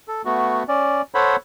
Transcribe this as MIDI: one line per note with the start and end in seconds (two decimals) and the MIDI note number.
0.08 0.22 69
0.25 0.63 57
0.25 0.63 59
0.25 0.63 66
0.68 1.02 61
0.68 1.02 74
1.15 1.36 69
1.15 1.36 72
1.15 1.36 73
1.15 1.36 78
1.15 1.36 83